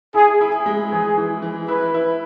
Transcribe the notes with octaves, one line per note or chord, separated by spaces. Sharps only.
E4 G#4
E4
G#4
G#3
E3 G#4
E3
E3
E4 B4
E4